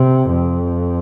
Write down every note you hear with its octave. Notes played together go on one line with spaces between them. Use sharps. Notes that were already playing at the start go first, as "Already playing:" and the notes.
Already playing: C3
F2